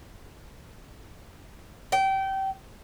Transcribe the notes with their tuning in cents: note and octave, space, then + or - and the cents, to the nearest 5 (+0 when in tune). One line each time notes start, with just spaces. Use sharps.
G5 -25